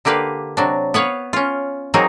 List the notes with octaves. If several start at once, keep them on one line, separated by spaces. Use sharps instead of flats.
D3 A#3 G4 B4 F5
C3 F#3 D4
B3 B4 C#5 F5
C#4 F4
F#3 A#3 C4 D#4 G#4 A#4